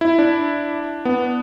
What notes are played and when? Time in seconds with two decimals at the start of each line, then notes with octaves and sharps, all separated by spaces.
0.01 E4
0.19 D4
1.05 B3